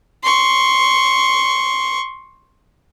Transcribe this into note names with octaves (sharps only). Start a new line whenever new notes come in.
C6 C#6